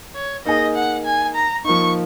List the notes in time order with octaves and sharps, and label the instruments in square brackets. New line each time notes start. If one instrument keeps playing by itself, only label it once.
[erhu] C#5
[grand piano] A#3 D#4 G#4 [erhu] D#5
[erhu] F#5
G#5
A#5
[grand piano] F3 A#3 D#4 [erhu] C#6